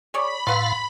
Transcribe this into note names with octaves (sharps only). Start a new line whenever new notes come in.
G#4 C#5 D5 B5
A2 B4 F5 F#5 C6